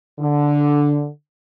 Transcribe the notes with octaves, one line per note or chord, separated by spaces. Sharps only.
D3